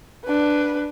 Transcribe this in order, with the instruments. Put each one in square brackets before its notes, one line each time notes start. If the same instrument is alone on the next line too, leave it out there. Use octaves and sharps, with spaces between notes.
[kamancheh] D4 B4